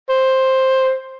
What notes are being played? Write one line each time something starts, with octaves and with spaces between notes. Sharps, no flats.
C5